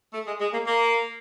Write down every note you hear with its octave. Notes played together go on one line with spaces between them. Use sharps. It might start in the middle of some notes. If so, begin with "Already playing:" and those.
A3
G#3
G#3
A#3
A#3